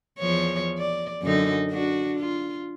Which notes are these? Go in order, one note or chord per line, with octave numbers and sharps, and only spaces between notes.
E2 F3 C#5
D5
F#2 D3 D#4
D4 F#4
F4